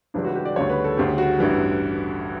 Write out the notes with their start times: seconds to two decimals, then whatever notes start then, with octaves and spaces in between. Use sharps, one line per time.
0.14 C#2 C#3 E3 G3 D4
0.24 F#4
0.35 G4
0.45 D5
0.56 D2 C#3 G3 C#5
0.70 B4
0.84 A4
0.97 D2 C#3 G3 G4
1.18 F#4
1.39 A1 G2 E3 G3